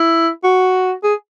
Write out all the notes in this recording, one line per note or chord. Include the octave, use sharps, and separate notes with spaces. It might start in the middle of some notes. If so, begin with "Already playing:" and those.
Already playing: E4
F#4
G#4